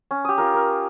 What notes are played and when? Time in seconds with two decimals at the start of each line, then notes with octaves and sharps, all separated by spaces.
0.11 C#4
0.25 G4 D#6
0.38 F4 A#4
0.54 A#4